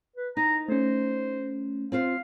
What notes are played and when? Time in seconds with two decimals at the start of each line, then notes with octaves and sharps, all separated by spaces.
0.16 B4
0.37 D#4 A#5
0.68 A3 C#4 C5
1.92 C4 F4 C5 F5